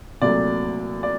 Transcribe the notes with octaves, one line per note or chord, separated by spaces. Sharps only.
C2 A#2 F#3 A3 D5
D5